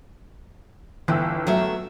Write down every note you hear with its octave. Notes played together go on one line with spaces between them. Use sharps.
G1 E3 G5 E6
F#3 A3 E5